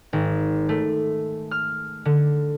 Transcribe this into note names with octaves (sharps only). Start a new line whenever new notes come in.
G#1
A3
F6
D3